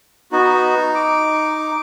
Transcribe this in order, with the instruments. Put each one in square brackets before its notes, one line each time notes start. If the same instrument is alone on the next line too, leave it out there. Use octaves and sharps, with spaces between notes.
[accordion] B3 F#4 [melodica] D#4
[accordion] D6